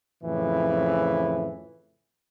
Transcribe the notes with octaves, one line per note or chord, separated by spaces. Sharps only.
F2 A2 C#3 E3